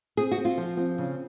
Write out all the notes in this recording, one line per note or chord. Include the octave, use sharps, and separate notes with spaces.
C4 G#4
F#4
C4
F4
F3
C4
C#3